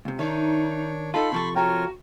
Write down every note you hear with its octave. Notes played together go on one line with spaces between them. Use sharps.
C#2 C3
D#3 D4 D#4 C#5 E5
D#4 F4 A4 A5 B5 C6
C3 F3 A4 C#6
F4 F#4 A#4 C#5 G5 A#5